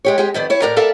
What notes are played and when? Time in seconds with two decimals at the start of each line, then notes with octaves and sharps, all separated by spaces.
0.05 G#3 G4 C#5
0.18 G#3 G4 G#4
0.34 F2 D#3 B3 D5
0.50 E4 C#5
0.62 A2 A#4 D5 A#5
0.76 A4 A#4 D5 E5 F5 A5